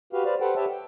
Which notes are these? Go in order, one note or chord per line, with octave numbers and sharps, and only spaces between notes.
F#4 G4 B4 F5
B4 C5 D5 F5
G4 A4 B4 C5 F#5 G5
G4 B4 C#5 E5 G5 A5
G5